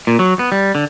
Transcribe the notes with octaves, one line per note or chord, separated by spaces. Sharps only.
A#2
F#3
B3
G3
D3